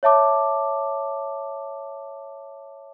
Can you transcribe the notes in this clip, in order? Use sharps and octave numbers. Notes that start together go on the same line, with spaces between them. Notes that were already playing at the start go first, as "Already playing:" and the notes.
C#5 E5 A5 D6